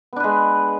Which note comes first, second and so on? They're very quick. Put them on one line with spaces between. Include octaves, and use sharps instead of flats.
B3 D4 B4 G#3